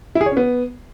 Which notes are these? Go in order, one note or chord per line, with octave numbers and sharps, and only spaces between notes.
E4
G#4
C#5
C#4
B3